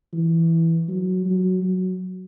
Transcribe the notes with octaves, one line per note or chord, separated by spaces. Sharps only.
E3
F#3
F#3
F#3